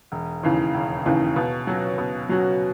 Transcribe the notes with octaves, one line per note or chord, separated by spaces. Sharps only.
E1
D#2 C#3 E3
E1
D#2 C#3 E3
B2
F#3 C#4 F#4
B2
F#3 C#4 F#4